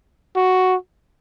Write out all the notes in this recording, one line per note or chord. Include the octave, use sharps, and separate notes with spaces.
F#4